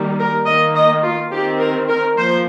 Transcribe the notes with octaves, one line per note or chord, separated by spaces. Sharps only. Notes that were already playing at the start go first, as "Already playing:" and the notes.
Already playing: D#3 G3 A#3
A#4
D#3 A#3 D#5
D#5
F4
D#3 C4 G4
A#4
A#4
F3 A#3 C5